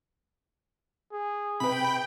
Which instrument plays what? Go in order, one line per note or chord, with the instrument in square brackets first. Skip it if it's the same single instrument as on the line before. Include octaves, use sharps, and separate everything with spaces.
[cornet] G#4
[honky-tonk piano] C3 B4 [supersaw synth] G5 [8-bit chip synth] B5